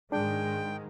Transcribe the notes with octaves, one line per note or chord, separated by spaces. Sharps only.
G#2 D#3 G#3 D4 G#4 G5